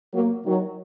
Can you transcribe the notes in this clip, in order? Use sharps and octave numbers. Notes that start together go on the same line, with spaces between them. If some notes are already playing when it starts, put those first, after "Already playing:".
F#3 A#3
D#3 F#3